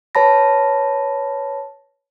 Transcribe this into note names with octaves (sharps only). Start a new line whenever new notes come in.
B4 C#5 A5 B5 A#6